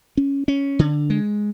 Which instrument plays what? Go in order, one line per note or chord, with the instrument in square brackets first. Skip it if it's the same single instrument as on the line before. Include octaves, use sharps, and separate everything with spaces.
[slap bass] C#4
C#4
D3
G#3